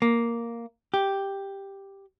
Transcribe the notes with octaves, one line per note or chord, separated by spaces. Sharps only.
A#3
G4